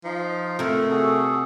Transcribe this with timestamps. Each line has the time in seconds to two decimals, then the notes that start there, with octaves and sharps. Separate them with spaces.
0.04 F3 D#4
0.59 C3 A3 A#4
0.91 F#4 G#4 A4